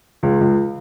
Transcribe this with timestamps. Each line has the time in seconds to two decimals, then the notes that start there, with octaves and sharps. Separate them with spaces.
0.23 C#2
0.41 C#2